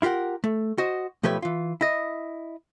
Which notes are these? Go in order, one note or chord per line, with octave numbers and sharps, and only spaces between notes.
E4 F4 G4 A#4 F#5
A3
F#4 C5 D#5
B1 F3 A3 G4 B4 C#5
E3 F4
E4 D#5